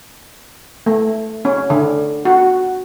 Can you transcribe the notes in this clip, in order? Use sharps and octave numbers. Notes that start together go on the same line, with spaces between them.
A3
C#4
D3
F#4